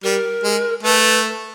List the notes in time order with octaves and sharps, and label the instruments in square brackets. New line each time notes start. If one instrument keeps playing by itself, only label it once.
[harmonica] G3 [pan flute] A#4
[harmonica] G#3
[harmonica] A3 [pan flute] B4